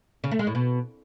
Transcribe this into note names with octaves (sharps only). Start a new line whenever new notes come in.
C#3
A3
G#3
A2
B2